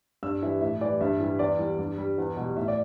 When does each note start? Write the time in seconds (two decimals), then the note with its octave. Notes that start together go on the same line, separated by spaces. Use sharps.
0.23 G2 E6
0.42 E3 E5
0.46 G3
0.61 A2 E5
0.81 E3 G3 D5
1.01 G2 E5
1.20 E3 G3
1.39 E2 D5
1.59 E3 G3
1.79 G2
1.98 G3
2.18 E2
2.37 B2 G3
2.57 A2 E5
2.68 D5